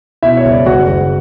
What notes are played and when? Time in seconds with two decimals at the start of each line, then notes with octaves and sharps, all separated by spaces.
0.22 B2 E4 E5
0.37 C#5
0.45 F#1
0.52 D5
0.66 F#1 F#4 F#5
0.88 F#1